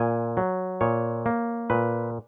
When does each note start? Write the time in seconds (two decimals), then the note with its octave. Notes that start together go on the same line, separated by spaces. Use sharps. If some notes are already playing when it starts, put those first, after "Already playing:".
Already playing: A#2 G#5
0.37 F#3
0.81 A#2 C#5
1.26 A#3
1.70 A#2 B4